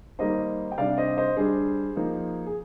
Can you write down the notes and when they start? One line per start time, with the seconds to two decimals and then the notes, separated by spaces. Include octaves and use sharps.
0.19 D#3 G3 A#3 D#4 C5 D#5
0.72 G5
0.78 C3 G3 D4 D5 F5
0.98 C5 D#5
1.17 C5 D#5
1.37 D3 G3 D4 G#4 C5
1.96 F3 A#3 D#4
2.46 G#4